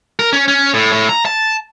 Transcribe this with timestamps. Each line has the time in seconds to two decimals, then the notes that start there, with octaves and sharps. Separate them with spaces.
0.19 A#4
0.33 C#4
0.48 C#4
0.74 A2
0.92 A2
1.09 A#5
1.25 A5